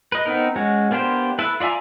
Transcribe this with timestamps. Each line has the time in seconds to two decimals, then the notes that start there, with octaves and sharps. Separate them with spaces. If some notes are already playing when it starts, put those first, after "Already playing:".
0.12 B4 D#5
0.26 B3 C4 D#4 A#4
0.56 G#3 C#4 F#4
0.91 A#3 B3 D4 G4 C5
1.39 E4 A4 B4
1.60 F4 D5 E5 G#5 A#5